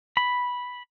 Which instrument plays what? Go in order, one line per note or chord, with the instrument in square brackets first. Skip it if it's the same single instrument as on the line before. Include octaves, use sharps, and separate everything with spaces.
[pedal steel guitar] B5